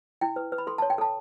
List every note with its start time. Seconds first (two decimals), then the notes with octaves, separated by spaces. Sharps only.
0.21 E4 G5
0.36 B4
0.52 B4
0.58 B5
0.67 A4 C6
0.78 A5
0.82 C#5
0.90 G5
0.98 A4 A5